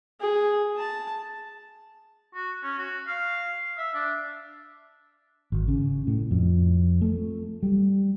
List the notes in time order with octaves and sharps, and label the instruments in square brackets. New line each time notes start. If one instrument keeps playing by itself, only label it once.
[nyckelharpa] G#4
A5
[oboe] F#4
C#4
F#4
F5
E5
D4
[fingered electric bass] G#1
C#3
A2
F2
A3
G3